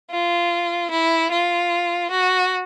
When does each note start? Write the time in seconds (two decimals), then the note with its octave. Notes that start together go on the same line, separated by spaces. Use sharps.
0.11 F4
0.91 E4
1.31 F4
2.11 F#4